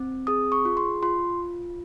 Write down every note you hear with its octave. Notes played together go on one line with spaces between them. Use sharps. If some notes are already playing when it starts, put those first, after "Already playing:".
Already playing: C4
G#4 D#6
C#6
F4
C6
F4 C6